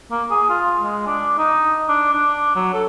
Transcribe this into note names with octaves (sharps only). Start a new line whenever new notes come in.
A#3
G#4
F4
G#3
D4
D#4
D4
D4
F#3
A4